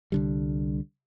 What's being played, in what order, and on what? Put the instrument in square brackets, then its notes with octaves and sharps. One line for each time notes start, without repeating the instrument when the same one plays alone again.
[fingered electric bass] C2 D3 G3